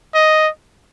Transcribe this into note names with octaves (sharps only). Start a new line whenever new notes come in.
D#5